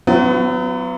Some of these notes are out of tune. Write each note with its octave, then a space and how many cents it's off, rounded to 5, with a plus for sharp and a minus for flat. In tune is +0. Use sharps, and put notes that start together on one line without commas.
F#3 +0 B3 +30 F4 -45